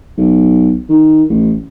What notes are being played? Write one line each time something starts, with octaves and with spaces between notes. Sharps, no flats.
B1
D#3
A1